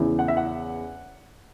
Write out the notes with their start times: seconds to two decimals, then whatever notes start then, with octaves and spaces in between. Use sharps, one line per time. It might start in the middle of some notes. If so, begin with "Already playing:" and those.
Already playing: E2 C#3 E3
0.19 F#5
0.28 E5
0.37 F#5